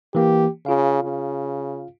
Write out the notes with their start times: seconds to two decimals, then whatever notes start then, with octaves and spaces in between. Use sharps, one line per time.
0.15 E3 A#3 G4
0.66 C#3 F4 F5
1.04 C#3